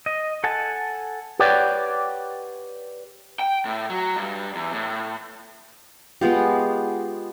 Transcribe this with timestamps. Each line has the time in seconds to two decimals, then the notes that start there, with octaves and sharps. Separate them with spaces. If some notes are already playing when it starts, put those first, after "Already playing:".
0.06 D#5
0.44 A4 F#5 G#5 A5
1.39 G4 B4 C#5 D5 F#5 G5
3.39 G5
3.65 A2
3.90 F#3
4.16 G2
4.55 E2
4.74 A2
6.21 G#3 B3 F4 G4